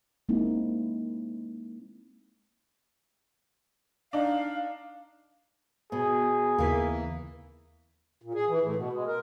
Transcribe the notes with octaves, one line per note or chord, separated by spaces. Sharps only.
G#3 A#3 C4 C#4 D#4 E4
D4 D#4 F5
B2 G#4
D#2 C#3 E3 A#3 B6
A#2
G#4
E3
A2
B2
G#3
A#4